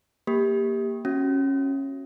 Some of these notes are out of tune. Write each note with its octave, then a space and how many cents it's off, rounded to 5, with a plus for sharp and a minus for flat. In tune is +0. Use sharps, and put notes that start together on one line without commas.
A#3 +0 G4 +15
C#4 -20 F#4 +0 E5 +35